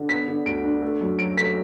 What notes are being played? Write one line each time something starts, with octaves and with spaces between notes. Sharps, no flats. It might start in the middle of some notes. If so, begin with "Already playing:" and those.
Already playing: D3
B3 B6
D3
D2 D7
D4
A3
F#2
F#3 D7
A3 B6